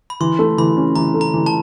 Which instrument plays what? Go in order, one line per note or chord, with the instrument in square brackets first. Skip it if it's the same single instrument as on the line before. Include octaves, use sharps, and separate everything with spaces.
[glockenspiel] B5
[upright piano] E3 [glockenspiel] C6
[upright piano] A3
[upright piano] E3 [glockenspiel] B5
[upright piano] C#4
[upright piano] E3 [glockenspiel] A#5
[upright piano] A3
[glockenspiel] A#5
[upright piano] E3
[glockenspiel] A5